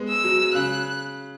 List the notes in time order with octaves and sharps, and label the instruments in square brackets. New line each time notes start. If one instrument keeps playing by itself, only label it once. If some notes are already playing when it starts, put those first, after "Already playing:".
Already playing: [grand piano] G#3 B3
[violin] E6
[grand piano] F#3
[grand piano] C#3 [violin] F#6